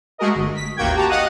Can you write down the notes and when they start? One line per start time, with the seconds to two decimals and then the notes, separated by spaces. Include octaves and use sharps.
0.18 G#3 A3 F#4 G#4 A#4 D#5
0.35 G1
0.55 B6
0.77 A1 D#2 A#3 F#4 G5 G#6
0.94 F#4 G4 A5 A#5
1.09 D#5 F5 F#5 D#6 F#6 D#7